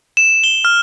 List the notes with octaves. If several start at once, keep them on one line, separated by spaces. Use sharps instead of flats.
E7
G7
F6